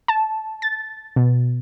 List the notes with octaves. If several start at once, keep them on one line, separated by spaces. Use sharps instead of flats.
A5
A6
B2